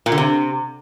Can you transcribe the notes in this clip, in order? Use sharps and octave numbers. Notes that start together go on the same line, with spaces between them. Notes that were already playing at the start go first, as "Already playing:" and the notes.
A#2
D3
C3